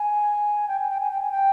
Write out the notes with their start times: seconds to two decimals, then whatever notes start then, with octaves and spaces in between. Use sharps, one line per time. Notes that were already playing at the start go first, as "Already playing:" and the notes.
Already playing: G#5
0.68 G5
0.80 G#5
0.89 G5
1.01 G#5
1.11 G5
1.21 G#5
1.31 G5